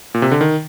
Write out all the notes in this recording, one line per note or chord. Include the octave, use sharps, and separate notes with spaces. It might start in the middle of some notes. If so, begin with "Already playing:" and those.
A#2
C3
D3
D#3